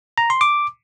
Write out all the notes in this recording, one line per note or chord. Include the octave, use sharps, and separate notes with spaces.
A#5
C6
D6